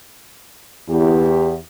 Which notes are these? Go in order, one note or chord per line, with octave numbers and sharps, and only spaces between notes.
E2 G4